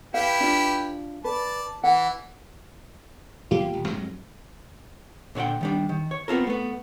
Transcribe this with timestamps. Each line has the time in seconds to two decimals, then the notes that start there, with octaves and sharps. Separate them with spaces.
0.14 E4 G4 B4 F5
0.40 D4 F4
1.24 B4 D5 A5
1.84 E3 F#5
3.51 E2 A#3 F4 G4
3.74 D#1
3.88 F2 G#2 F#3
5.35 A#2 D3 C#5 F#5 G5
5.61 D#3 G3 D4
5.89 D#3
6.11 C#5
6.28 B3 C4 F4 A4 A#4
6.47 A3 B3